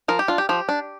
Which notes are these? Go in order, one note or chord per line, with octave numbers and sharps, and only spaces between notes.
F3 A#4
G4
D4 F4
G4
F3 G4
D4